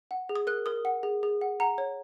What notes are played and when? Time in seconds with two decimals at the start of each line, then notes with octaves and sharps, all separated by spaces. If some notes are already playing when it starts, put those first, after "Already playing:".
0.11 F#5
0.29 G#4
0.36 D#6
0.47 A#4 F#6
0.66 A#4 D#6
0.85 F#5
1.03 G#4
1.23 G#4
1.41 F#5
1.60 F#5 A#5
1.78 C#5